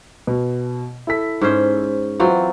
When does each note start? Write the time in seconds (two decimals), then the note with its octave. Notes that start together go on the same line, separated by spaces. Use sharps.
0.27 B2
1.07 E4 A4 B6
1.42 G#2 C#4 C5
2.20 E3 F#3 C4 F4